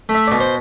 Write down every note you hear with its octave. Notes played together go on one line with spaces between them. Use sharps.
A3
E5
B2 D5
C5